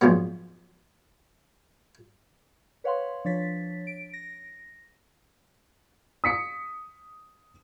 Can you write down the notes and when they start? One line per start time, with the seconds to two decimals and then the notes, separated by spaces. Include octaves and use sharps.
0.01 A#1 G#2 F3 F#3 B3
2.84 B4 C#5 F5 F#5 C6
3.25 F3 D4 C#5 A6 B6
3.87 D7
4.13 A#6
6.24 D#6 B6 C#7